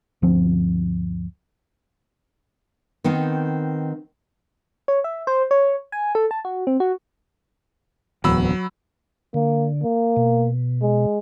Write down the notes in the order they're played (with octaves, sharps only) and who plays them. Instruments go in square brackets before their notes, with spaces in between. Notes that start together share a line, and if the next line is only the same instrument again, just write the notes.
[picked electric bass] G1 D2 F3 C4
[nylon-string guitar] D#3 B3 C4 D#4
[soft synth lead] C#5
E5
C5
C#5
G#5
A4
A5
F#4
C4
F#4
[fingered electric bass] D1 E2 [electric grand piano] F#3 B5 E6
[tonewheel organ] D3 [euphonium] A#3
[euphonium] A#3
[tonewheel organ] B2
[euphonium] G#3